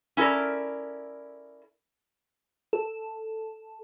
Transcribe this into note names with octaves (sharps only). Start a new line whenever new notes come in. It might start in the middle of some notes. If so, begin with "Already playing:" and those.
C#4 E4 A4 A#4 D5
A4